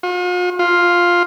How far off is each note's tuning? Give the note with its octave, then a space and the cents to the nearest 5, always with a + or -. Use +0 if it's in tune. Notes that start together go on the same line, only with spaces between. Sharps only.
F4 +45
F4 +5